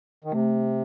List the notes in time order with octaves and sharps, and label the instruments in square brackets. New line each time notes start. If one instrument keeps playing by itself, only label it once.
[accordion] D#3
[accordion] C3 [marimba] A3